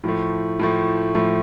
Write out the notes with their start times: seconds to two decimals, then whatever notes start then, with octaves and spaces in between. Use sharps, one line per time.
0.04 A2 F3 A3
0.59 A2 F3 A3
1.15 A2 F3 A3